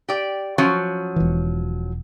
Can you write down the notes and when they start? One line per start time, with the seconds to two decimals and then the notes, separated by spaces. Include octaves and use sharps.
0.09 G4 D5
0.58 F3 F#3 C#4
1.16 E1 E3